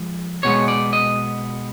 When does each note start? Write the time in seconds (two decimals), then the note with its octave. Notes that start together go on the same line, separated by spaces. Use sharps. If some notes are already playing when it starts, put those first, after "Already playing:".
Already playing: F3 G#3
0.43 B2 G#3 B3 C#5
0.68 D5
0.93 D#5